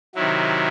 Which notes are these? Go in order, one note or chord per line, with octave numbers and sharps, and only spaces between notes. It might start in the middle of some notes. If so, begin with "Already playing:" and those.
C3 D#3 F#3 E4